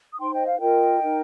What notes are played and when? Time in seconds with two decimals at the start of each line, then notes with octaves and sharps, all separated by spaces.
0.12 D#6
0.19 D#4 C5 G5 C6
0.33 D#5 G5
0.46 F5
0.59 F4 A#4 D#5 G5
1.02 D#4 A#4